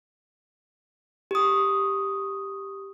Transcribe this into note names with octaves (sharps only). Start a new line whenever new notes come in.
G4 D#6